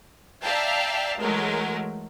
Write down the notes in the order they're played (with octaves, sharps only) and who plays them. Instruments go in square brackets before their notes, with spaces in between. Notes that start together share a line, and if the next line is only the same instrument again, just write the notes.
[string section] D5 E5 F5 G5 A5 A#5
E3 F#3 G#3 A3 A#4